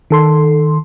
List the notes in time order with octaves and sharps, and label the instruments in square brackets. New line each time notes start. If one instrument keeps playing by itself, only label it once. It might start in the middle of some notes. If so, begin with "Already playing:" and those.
[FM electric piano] D#3 A4 C6